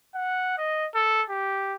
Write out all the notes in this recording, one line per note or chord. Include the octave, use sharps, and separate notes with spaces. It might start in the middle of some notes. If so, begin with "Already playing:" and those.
F#5
D#5
A4
G4